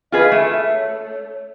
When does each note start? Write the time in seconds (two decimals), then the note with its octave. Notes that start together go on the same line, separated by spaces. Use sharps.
0.12 F4 G#4 B4 D#5
0.32 A3 E5
0.74 C#5